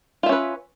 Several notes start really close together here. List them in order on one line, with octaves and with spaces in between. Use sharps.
F4 E5 C#4 B4